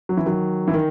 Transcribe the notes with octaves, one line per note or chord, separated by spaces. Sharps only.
F#3
E3
D#3 F#3
E3
D#3